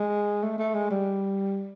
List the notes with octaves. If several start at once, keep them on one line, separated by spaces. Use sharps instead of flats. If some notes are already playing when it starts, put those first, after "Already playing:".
Already playing: G#3
A3
A3
G#3
G3